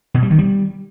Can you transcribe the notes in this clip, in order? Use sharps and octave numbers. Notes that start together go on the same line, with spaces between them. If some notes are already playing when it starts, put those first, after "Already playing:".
B2
G3
D#3
G3